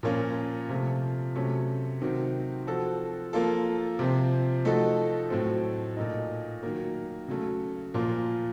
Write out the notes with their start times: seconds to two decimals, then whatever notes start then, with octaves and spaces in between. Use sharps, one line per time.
0.03 A#2 F3 A#3 C#4 F4
0.69 C3 F3 A3
1.35 C3 F#3 A3 C#4
2.01 C3 D#3 F#3 C4 F#4
2.67 F3 C4 F#4 A4
3.33 F3 A#3 F4 A4
3.99 C3 F3 C4
4.65 F3 A3 D#4 F#4 A4
5.30 A2 F#3 A3 C4
5.96 A#2 A3 D#4
6.63 D#3 F#3 A#3
7.28 C#3 F#3 A3
7.94 A#2 F3 A#3 F4